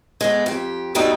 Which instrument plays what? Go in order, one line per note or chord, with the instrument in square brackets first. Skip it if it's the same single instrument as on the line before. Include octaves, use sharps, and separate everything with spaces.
[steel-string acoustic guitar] G#3 A3 B3
F2 G4
G2 B2 D3 G3 A3 D#4